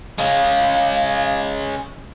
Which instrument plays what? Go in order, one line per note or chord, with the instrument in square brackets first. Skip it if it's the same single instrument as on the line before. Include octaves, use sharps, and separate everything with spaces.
[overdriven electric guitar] G#3 C#4 [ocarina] F5